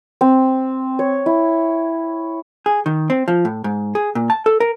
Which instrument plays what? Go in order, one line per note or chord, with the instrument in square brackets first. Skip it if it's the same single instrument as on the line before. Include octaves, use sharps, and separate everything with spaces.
[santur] C4
C#5
E4
[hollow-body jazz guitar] G#4
D#3
C4
F3
A2
G#2
G#4
A#2
A5
A4
A#4